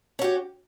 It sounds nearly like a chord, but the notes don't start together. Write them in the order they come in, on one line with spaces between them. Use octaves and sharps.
C#4 F#4 G4